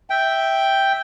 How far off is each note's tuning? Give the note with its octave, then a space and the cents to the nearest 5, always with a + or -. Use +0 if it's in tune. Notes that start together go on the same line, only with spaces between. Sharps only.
E5 -5 G5 +0